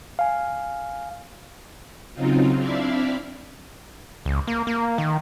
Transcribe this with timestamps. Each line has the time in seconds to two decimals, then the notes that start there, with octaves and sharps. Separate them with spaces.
0.19 F5 G#5
2.14 C#3 F#3 C4 D#4 F4
2.57 C4 D4 E4 D5 E5 F5
4.25 C#2
4.48 A#3
4.67 A#3
4.98 D#3